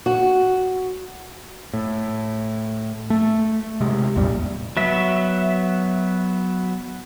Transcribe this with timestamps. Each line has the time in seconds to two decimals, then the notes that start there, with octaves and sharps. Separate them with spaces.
0.06 F#4
1.73 A2
3.10 A3
3.81 C3 G#3
4.16 A#1 E2 A2 G3
4.77 F#3 B3 E5